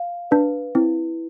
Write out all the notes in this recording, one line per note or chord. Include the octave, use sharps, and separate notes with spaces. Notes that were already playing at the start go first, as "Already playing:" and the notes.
Already playing: F5
D4 B4
C4 E4